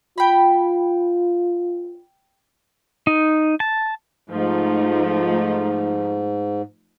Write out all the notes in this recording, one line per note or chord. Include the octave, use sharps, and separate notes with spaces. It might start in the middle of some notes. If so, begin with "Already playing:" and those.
F4 G5 B5
D#4
A5
G#2 F3 A3 D#4